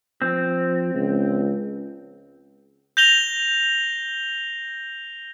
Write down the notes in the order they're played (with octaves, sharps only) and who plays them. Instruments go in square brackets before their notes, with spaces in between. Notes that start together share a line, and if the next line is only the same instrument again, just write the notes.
[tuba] F3 [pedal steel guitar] C4
[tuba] C#2
[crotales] G6 A#6 F7 G7